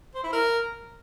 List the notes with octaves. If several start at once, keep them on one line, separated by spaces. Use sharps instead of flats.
C5
E4
A#4